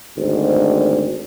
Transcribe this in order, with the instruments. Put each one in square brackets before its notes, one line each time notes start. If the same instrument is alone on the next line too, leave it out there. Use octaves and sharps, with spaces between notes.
[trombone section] G#1 D2